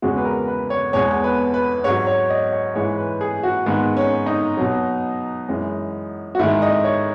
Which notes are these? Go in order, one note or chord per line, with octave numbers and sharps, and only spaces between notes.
E2 C#3 G#3 F#4
B4
A#4
B4
C#5
E2 B2 G#3 C#5
B4
B4
G#2 F#3 C#5
C#5
D#5
C#5
G#2 E3 G#3 C#5
B4
G#4
F#4
G#2 D#3 G#3 B3
C#4
D#4
B2 F#3
F#2 E3 G#3
F#4
G#2 D#3 G#3 E4
D#5
C#5